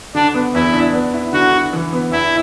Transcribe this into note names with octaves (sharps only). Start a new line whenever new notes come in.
D3 D4
B3
E2 E4
D4
B3
E4
D3 F#4
D3
E3
B3
E2 E4